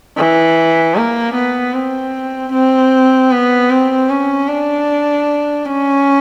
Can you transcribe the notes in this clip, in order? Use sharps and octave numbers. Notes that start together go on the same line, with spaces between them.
E3
A#3
B3
C4
C4
B3
C4
C#4
D4
C#4